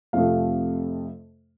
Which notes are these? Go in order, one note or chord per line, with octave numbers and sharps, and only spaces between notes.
F2 C3 F3 A3 F5